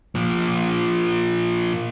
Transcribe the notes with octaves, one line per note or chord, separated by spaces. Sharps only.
A#2 F3